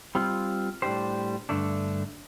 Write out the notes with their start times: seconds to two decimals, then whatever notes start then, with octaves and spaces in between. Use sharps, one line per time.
0.15 G3 C4 F4
0.82 A2 G3 D4 G4 C5
1.49 G2 D3 A3 D4